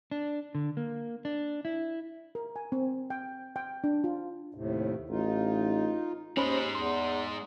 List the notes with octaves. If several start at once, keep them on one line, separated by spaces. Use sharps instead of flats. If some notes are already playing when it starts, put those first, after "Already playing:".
D4
D3
A#3
D4
E4
A#4
G#5
C4
G5
G5
D4
F4
D#2 A2 C3
A1 D#4 F4
D#2 G#3 C#4 D#4 C5 B5
E2 C6